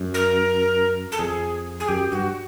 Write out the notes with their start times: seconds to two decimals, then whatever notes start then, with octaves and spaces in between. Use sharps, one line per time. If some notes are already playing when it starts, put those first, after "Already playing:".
Already playing: F#2
0.14 A#4
1.12 A4
1.19 F2 G#4
1.80 G#4
1.88 F#2 G4
2.12 G2 F#4